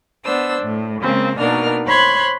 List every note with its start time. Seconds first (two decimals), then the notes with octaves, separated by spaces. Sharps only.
0.25 B3 D4 C5 E6
0.62 A2
1.02 C#3 G#3 A#3 C4
1.39 B2 A#3 D4 D#4 A#4 F6
1.85 C5 C#5 B5 C6 F#6 G#6